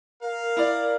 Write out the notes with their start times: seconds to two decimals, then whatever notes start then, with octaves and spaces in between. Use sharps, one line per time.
0.21 A#4 F5
0.57 E4 D5